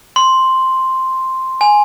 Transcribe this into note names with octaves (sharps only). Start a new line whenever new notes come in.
C6
G#5